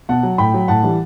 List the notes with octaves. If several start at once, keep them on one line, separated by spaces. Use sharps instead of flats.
B2 F#5 A5
F#3
A2 G5 B5
F#3
A2 F#5 A5
E3 G3